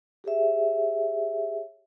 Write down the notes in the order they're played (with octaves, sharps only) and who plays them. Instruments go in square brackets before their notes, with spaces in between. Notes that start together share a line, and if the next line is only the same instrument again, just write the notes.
[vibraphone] G4 G#4 C#5 E5